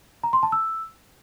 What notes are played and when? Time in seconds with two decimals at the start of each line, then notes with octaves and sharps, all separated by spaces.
0.24 A#5
0.33 C6
0.43 A5
0.52 E6